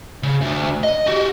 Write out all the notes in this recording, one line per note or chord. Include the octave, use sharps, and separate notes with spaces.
C#3
D2
D#5
F#4 G4